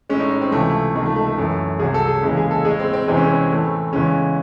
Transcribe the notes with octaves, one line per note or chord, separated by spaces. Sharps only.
A2 G#3 C#4
D#4
D#4
C4
C#2 C3 E3 A3
A3
C#2 C3 D#3 A3
A3
A3
A3
F#2 E3 A3
C2 C3 F#3 G#4
A4
G#4
D#2 C#3 E3 G#3
G#4
A4
A2 G#3 G#4
C4
C4
E2 C3 E3 G#3 C4
C#4
C4
A2 E3 A3
E2 C#3 E3 G#3 C#4